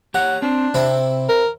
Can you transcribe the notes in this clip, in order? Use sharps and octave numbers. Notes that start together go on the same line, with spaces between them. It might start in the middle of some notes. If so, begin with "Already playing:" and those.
G4 C#5 F#5 A#5
C4 D4
C3 C4 E4
A#4